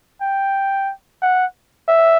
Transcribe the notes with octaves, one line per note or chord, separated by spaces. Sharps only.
G5
F#5
E5